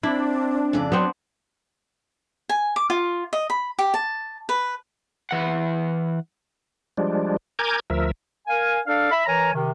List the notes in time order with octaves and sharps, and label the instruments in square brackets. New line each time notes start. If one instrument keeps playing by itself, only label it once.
[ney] C4 [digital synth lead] D4 [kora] E4
[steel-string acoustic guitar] F2 C#3 D5
[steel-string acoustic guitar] F#3 [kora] B3 C4
[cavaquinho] G#5
D6
F4
D#5
B5
G4
A5
B4
[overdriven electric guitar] E3 F#5
[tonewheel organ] F3 G3 G#3 D4
A#4 G#5 A#5 D6 G6 G#6
D2 F3 A#4 E5
[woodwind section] A#4 F5 G#5
D4 A4 D5 F5
E5 B5
E3 A#4 C#5 G#5 A#5
C3 D#3